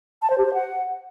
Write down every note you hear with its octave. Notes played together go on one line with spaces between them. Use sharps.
A5
C5
G4
C5
F#5